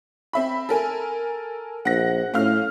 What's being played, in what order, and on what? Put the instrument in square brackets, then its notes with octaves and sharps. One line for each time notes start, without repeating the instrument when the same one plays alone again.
[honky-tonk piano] C4 E5 B5
A4 A#4 G#5
[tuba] A#1 [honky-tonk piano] F#5 A#6
[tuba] A2 [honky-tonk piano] C#4 F5 F6